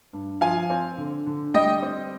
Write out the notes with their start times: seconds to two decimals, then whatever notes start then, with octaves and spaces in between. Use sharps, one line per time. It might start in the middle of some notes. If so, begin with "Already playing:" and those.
0.13 G2
0.41 F3 F5 G#5
0.70 C4
0.97 D3
1.26 D3
1.54 G3 D#5 G5
1.82 C4